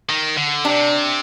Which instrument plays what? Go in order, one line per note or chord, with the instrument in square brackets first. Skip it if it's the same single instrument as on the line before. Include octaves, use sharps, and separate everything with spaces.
[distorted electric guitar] D#3
D3
[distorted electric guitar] C3 [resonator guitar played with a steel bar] D4